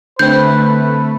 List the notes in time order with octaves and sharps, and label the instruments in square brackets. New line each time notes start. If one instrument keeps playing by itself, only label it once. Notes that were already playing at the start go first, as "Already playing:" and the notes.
[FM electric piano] D3 C4 [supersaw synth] A3 [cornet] B4 [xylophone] G6